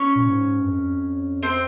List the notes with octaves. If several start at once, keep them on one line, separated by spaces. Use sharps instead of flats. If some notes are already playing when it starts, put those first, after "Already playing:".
Already playing: C#4 C#5
A#2
G#2
G2
F2
C4 C5